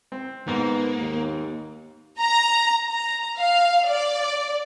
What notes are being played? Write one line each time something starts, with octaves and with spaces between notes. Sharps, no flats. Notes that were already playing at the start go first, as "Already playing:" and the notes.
C4
G#2 A#3 B3
D#2
A#5
A#5
F5
D5